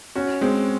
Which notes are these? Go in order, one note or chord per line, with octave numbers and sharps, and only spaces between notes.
C#4 F#4
G#3 C4